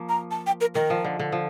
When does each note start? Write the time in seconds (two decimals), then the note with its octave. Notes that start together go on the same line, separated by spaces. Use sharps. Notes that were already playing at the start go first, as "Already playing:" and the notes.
Already playing: F3 A#3
0.09 A#5
0.31 A5
0.46 G5
0.61 A#4
0.75 D#3 A#4
0.90 F3
1.04 D3
1.19 D3
1.32 F3